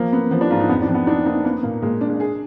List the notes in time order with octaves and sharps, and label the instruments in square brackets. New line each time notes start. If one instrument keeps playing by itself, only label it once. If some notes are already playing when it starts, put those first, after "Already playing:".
Already playing: [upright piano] F3 [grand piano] A#3
[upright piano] B3
[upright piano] F3 [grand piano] B3
[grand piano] D4
[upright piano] G#2 [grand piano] F4
[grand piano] D#4
[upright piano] F2 [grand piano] B3
[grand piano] D4
[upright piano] F2
[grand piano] B3
[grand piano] D4 [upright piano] D#4
[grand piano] A#3 [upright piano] D#4
[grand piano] A#3 [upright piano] B3
[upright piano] A#2 [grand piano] A#3
[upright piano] A#2 [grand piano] G#3
[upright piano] D4
[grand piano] G#3
[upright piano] G#4